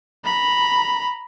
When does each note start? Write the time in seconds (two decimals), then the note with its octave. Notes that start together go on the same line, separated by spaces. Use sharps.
0.24 A#5 B5